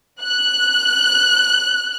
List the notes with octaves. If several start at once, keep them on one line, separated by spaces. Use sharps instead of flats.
F#6